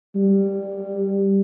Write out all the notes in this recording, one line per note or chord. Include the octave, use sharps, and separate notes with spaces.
G3